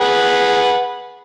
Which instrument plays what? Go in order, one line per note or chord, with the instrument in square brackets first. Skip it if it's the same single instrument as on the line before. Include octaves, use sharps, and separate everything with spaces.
[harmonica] G#4 B4 F#5